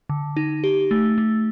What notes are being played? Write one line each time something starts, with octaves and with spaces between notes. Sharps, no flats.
D3
D#4
G4
A3
A3